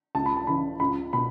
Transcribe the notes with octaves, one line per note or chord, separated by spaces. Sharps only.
C#2 A5
B5
A5
C#3 E3 B5
C#2 B5
B2 B5